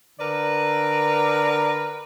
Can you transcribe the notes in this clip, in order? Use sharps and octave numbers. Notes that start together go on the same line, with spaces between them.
D3 A#4 B4 D5